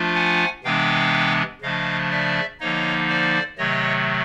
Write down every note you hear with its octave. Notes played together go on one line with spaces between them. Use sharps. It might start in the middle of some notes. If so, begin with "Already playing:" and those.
Already playing: F3 A3 D4 F4
F#5 G#5
C3 E3 G#3 B3 D4 F5 G5
C#3 F3 A3 D4 D#5 F5
D5 E5
D3 F3 A#3 D#4 C#5 D#5
C5 D5
C3 D#3 F#3 A3 C#5 D#5